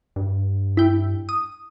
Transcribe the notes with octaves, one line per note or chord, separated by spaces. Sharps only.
G2
E4 G5
D#6